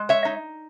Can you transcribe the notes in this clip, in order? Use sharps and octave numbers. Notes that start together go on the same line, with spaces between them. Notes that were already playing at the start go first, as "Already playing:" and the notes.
Already playing: G#3
C#5 E5
D#4